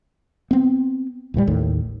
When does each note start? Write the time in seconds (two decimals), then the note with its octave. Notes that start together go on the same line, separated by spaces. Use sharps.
0.51 B3 C4
1.34 D#1 A2 E3 G3
1.47 A1 D#2 A2